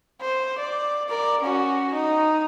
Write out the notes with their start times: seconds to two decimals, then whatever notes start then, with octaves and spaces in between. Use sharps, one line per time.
0.21 C5
0.58 D5
1.09 A#4 D5
1.41 C#4 F#4
1.93 D#4